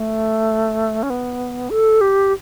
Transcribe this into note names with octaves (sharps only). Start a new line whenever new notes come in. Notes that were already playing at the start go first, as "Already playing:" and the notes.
Already playing: A3
C#4
B3
A4
G4